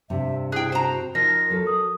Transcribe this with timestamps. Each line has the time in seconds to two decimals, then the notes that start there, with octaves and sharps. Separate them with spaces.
0.10 G2 C3 E5
0.52 E4 G#4 G5 F#6
0.72 F#4 C5 A#5
1.15 F3 D#4 A#4 A#6
1.50 F#3 A4
1.67 D#6